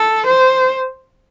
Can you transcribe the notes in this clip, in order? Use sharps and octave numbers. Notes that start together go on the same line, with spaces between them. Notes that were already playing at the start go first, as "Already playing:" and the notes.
Already playing: A4
C5